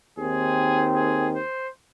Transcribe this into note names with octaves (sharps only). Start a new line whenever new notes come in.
D#2 D#3 C4 G#4
G#4
C5